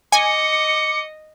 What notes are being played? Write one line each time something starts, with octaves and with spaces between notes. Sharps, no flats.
D#5 G#5 D6 C#7